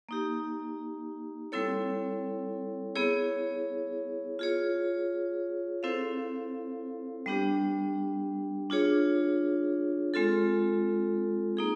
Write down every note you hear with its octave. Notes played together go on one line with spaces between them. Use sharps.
A#3 D#4 G4
G3 C4 E4 A4 C#5
B3 E4 G#4 C#5
F4 G#4 C#5
C4 E4 A4 C5 F5
G3 B3 D4 G4
D4 F4 G#4 C#5
G#3 C4 F4 A4
A#3 D#4 G#4